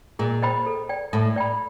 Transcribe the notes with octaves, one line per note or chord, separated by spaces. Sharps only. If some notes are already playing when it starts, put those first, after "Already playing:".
A#2 G#4
C5 D#5 G5 B5
A4
D5 G5
A2 A4
D5 G5 B5